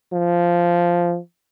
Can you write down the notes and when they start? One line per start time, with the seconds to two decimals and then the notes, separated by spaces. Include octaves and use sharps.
0.13 F3